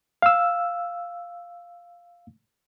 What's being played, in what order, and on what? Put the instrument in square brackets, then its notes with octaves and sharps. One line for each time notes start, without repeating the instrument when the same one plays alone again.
[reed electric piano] F5 E6